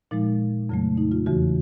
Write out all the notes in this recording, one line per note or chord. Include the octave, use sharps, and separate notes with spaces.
A#2 F3 G#3 D#4
F2 C#3 F#3 A3
D#4
F4
E2 C#3 E3 F#4